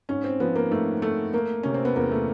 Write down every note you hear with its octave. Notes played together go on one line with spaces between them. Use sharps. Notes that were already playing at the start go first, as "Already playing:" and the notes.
G#2 C#4
C4
F3 B3
A#3
G#2 A3
A3
A3 A#3
C3 C#4
C4
B3
E2 A#3
A3